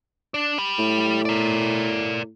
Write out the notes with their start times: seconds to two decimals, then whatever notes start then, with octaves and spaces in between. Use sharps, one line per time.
0.34 D4
0.58 G4 B5
0.79 A2
1.25 A#4 D5